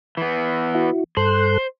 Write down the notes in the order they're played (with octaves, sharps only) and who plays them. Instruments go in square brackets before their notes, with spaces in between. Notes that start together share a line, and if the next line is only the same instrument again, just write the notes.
[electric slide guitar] E3 B3
[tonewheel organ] E4 F#4
[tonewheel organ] G2 A4 F#6 [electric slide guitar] C5